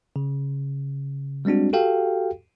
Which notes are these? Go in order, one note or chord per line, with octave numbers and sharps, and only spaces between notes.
C#3
G3 G#3 C4 D4 F#4
F#4 G4 A4 F5 G5